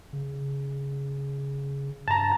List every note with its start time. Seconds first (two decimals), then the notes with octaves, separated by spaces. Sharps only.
0.13 C#3
2.08 G2 A5 A#5